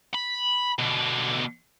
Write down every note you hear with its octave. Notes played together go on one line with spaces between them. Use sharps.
B5
B2 D3